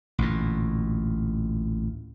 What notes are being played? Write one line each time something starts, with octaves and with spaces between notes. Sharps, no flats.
A1 D2 A#2